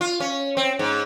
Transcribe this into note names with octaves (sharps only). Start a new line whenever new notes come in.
F4
C#4
C4
G#2